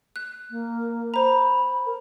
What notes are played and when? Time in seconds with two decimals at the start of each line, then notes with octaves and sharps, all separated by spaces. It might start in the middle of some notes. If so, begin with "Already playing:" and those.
0.16 F#6
0.50 A#3
1.14 C5 A#5 B5
1.86 A#4